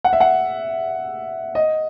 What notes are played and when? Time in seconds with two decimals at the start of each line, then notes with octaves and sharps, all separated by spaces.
0.04 F#5
0.13 E5
0.20 F#5
1.55 D#5